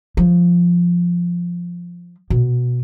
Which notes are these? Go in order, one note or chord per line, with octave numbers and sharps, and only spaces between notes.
F3
B2